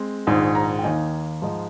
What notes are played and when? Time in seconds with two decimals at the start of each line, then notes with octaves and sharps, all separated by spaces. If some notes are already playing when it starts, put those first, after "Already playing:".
Already playing: G#3 C4
0.27 A#1 G#2 D#3
0.55 A#5
0.79 G5
0.84 D#2 D#3 A#3 D#4 G#5
1.42 G#2 F3 G#3 D#4